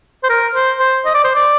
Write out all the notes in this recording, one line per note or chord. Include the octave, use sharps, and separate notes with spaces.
C5
A#4
C5
C5
D#5
D5
C5
D5